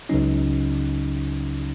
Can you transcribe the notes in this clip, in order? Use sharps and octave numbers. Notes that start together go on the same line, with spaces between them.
C#2 C#3 F#3 C#4 D#4